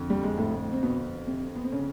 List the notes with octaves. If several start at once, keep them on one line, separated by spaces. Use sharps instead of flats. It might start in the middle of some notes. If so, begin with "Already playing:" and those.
Already playing: F2 D3
G3
G#3
A2 A3
C4
B2 B3
C3 C4
B3
C4
C#3 C#4